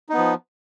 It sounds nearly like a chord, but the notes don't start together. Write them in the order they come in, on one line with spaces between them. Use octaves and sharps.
D#4 B3 F3